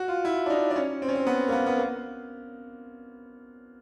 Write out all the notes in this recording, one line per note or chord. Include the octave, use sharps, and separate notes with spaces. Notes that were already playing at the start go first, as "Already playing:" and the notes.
Already playing: F#4
F4
E4
D4
D#4
D4
C#4
C4
C#4
C4
B3
A#3
B3
B3
A#3